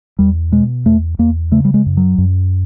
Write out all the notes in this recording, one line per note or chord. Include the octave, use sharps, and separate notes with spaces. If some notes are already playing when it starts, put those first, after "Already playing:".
E2 G3
B2 G#3
E2 A3
E2 A#3
C#3 A3
G3
G#3
F#2
F#3
F#2